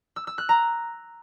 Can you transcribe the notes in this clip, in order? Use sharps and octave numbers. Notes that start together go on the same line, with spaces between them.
E6
E6
F#6
A#5